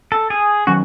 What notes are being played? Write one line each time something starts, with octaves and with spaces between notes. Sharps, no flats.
A4
G#4
D#3 F#3 C#4 F#4